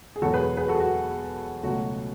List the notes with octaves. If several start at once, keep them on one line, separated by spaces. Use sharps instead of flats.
G#4
E1 E2 B2 F#3 F#4 A4
G#4 B4
G#4 B4
F#4 A4
G#4
F#4
C#2 B2 F#3 A3 F#4